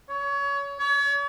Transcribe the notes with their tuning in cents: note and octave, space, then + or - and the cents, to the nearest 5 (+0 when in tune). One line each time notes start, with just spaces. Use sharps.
C#5 +25
C#5 +40